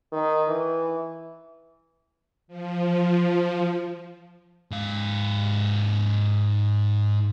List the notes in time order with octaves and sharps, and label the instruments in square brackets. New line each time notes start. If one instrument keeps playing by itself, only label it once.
[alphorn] D#3
E3
[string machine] F3
[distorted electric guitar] G#2 F5